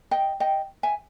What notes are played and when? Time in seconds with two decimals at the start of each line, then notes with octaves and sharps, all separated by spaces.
0.11 D#5 G5
0.40 D#5 G5
0.83 E5 G#5